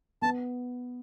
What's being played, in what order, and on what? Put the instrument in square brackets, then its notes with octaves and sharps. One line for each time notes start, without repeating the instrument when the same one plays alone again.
[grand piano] B3 [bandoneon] A5